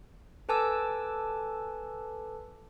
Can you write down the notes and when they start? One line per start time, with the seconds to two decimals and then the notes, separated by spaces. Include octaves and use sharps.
0.49 A4 B4 G#5 A5 D6 E6